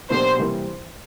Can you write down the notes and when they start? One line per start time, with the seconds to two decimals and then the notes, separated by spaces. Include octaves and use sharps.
0.10 B2 F#3 A#3 D4 G4 C5
0.38 C3 E3 G3 A#3